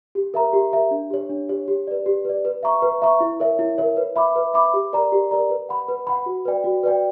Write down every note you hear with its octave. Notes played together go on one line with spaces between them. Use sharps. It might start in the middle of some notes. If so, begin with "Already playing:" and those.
G4
A#4 E5 A#5
G4
A#4 E5 A#5
D4
G4 C#5
D4
G4 C#5
G4
B4 D5
G4
B4 D5
B4
E5 A#5 C#6
B4
E5 A#5 C#6
E4
A#4 C#5 E5
E4
A#4 C#5 E5
B4
E5 B5 D6
B4
E5 B5 D6
G4
A#4 D5 A#5
G4
A#4 D5 A#5
B4
F#5 B5
B4
F#5 B5
F#4
B4 D5 G5
F#4
B4 D5 G5